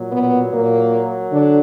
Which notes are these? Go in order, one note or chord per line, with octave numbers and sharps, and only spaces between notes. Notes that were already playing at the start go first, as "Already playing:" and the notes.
Already playing: A#2 F#3
B2 B3
A#2 A#3
D3 D4